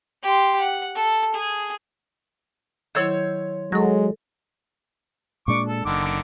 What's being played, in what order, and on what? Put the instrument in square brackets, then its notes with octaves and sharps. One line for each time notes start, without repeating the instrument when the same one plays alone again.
[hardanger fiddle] G4 C6
F#5
A4
G#4
[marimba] D#3 F#3 E4 [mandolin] C5 C#5 E6
[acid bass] F#3 [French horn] G#3 [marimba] A4 A#6
[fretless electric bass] A#2 G#3 D4 [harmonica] C#6 D6
[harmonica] A4
[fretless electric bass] F#1 [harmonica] D3 D#3 D6